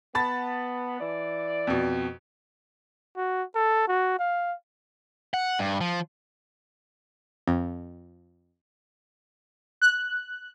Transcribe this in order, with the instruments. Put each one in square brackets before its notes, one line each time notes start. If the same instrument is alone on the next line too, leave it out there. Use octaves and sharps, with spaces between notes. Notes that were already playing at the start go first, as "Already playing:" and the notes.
[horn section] B3 [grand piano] A5 B5 A6
[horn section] E3 D5
[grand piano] F2 B2
[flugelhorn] F#4
A4
F#4
F5
[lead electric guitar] F#5
G2
F3
[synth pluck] F2
[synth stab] F#6